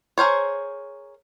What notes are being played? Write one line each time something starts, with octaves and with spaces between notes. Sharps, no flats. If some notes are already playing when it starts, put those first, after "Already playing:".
G#4 A#4 C5 C#5